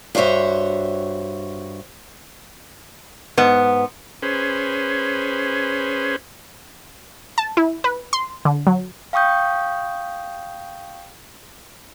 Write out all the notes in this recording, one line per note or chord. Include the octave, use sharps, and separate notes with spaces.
G2 F#4 C5 C#5 E5
G#2 B3
C#4 G#4 B4 C5
A5
E4
B4
C6
D3
F#3
F5 G5 C#6 D#6 G6